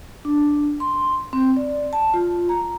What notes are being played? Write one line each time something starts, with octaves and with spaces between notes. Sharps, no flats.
D4
C6
C4
D5
A5
F4
A#5